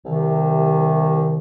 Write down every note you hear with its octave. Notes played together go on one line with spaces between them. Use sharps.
C2 C3 D#3